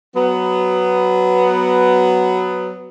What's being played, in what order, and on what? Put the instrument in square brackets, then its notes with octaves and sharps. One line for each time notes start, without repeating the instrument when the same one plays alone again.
[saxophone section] F#3 B3